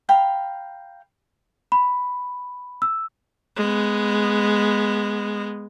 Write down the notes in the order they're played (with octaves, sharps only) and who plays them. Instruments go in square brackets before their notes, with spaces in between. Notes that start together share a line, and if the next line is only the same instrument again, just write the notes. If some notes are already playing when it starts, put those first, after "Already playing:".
[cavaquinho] F5 G5 A#5 B5
[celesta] B5
E6
[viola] G#3 B3